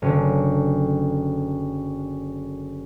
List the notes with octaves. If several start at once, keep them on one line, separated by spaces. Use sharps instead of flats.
F#1 D3